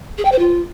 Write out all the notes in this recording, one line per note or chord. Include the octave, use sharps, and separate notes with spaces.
G#4
G5
C5
F4